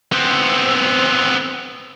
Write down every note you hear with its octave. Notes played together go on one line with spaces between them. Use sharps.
B3 C4